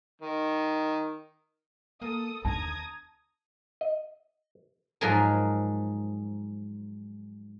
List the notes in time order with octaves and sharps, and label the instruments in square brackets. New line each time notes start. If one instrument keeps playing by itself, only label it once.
[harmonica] D#3
[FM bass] A#3 [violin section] A4 D#6
[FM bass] D#2 [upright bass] D3 [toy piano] A5 [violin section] A#5 D#6 G#6
[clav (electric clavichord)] D#5
[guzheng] G#2 F3 F#3 G#4 A#4